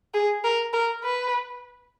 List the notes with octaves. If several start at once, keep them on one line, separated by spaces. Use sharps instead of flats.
G#4
A#4
A#4
B4